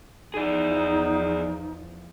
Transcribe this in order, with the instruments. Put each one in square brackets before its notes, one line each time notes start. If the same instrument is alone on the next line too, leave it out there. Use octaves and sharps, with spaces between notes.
[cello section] E2 F3 [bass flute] D#4 [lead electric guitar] G#4 D5